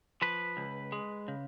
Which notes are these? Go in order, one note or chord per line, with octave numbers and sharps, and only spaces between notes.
F3 B4
C#2
G#3
C#3